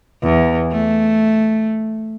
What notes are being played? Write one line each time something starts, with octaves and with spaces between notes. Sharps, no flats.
E2
A3